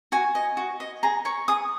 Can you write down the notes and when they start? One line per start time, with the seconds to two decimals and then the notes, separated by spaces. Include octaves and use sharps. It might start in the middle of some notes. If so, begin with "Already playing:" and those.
0.12 F#4 G#5
0.35 D#5
0.57 F#4
0.80 D#5
1.03 G#4 A#5
1.25 C#5 C#6
1.48 G#4 D#6